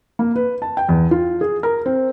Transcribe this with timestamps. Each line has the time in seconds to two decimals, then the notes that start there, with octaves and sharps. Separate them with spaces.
0.19 A#3
0.36 B4
0.62 A5
0.77 G5
0.89 E2
1.11 F4
1.41 G#4
1.63 A#4
1.86 C4